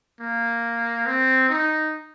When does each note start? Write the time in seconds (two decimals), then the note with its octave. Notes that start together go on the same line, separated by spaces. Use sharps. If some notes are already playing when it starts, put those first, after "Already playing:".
0.20 A#3
1.06 C4
1.49 D#4